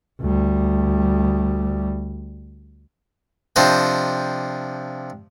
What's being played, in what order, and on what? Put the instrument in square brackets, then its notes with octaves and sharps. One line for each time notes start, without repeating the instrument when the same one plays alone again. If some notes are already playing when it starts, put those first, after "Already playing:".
[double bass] D2 G3
[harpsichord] C3 F3 D4 C5 D#5 G5